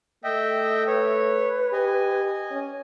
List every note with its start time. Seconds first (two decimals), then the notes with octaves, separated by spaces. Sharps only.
0.24 A3 D#5 E5 G5
0.87 B4 C#5
1.73 G4 D#5 G#5
2.51 C#4